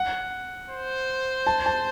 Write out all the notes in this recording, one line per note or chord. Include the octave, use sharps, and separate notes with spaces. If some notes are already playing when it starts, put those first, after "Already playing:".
Already playing: F#5
C5
A5
A5